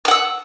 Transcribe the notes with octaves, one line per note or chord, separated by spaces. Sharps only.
F#5 E6 F6